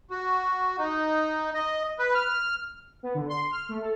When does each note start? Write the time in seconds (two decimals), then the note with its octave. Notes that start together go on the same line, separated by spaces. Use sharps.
0.10 F#4
0.78 D#4
1.54 D#5
1.99 B4
2.15 F6
3.03 B3
3.14 D3
3.29 C6
3.51 F6
3.69 A3
3.81 A4